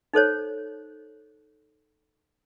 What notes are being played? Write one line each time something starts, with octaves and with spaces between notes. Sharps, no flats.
D#4 A4 C5 C#5